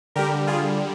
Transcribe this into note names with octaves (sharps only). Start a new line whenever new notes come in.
D3 G3 G4 A#4
F4 G#4